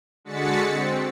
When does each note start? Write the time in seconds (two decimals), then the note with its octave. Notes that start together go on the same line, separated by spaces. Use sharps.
0.25 D3 G#3 F#4 A6 B6 C#7
0.70 C4